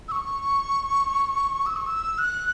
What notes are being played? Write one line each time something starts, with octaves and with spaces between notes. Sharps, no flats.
E6
C#6
E6
C#6
E6
F#6